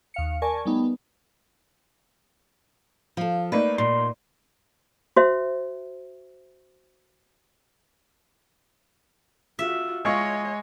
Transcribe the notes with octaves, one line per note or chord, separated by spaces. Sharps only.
D#2 F5 C#7
A#4 D5 G#5 A5 C#6
G3 A3 B3 D#4
F3 A4 F5
A3 A#3 D#4 B4 D5
A#2 C6
F#4 C5 E5
F4 F#4 E5
G#3 F4 C#5 D#5 C#6